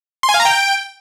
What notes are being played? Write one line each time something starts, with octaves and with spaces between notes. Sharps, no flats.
C6
G#5
F5
A#5
G5